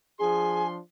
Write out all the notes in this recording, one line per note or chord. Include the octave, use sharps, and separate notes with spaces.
F3 D4 G#4 G#5 C6